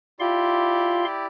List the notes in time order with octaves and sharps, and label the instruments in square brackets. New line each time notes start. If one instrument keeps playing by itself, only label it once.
[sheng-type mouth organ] E4 G4 D5 [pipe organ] F4 F5 C6